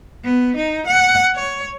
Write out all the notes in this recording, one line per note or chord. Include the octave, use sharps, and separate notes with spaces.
B3
D#4
F#5
C#5